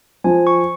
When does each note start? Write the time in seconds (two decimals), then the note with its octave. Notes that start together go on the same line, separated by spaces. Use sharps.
0.24 F3 G#5
0.47 C#6